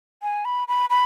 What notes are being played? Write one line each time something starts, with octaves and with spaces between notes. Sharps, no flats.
G#5
B5
B5
B5